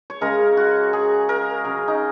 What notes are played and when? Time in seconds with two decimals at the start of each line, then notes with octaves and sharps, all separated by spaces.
0.10 C#5
0.21 C#3 G#3 A#4
0.57 F#4
0.93 G#4
1.29 A#4
1.64 C#3 F#3
1.88 D#4